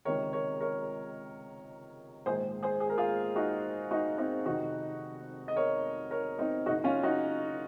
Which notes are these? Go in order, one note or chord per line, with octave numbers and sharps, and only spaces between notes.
C#2 C3 D#3 A#4 C#5
A#4 C#5
A#4 C#5
A#1 G#2 D#3 G#4 C5
G#4 C5
G#4
A#4
F4 G#4
D#4 F#4
D#4 F#4
C4 D#4
F1 F2 C3 D#3 D#4 F#4
D#5
A#4 C#5
A#4 C#5
C4 D#4
F#1 F#2 C#3 D#4 F#4
C#4 F4
D#4 F#4